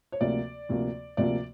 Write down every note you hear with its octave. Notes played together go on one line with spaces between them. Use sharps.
C#5
D2 C3 F3 A#3 D5
D2 C3 F3 A#3
D2 C3 F3 A#3 D5